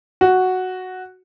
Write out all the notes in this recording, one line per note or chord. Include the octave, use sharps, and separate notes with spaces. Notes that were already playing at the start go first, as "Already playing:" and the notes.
F#4